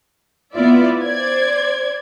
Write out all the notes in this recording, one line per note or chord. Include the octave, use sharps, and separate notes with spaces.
B3 E4 F4 D5 E5
C5 D5 G#6